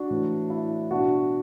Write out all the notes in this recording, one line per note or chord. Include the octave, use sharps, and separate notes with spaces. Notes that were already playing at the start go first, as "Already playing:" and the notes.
Already playing: D4 F#4
A2 E3
E4
B2 D4 F#4